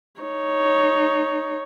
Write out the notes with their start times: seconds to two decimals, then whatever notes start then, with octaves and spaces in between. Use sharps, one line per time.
0.21 D#4 C#5